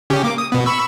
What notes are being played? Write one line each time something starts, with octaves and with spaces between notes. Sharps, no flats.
C#3 C#4 G4
A#3 D6
D#6
B2 B3
B5 C#6 E6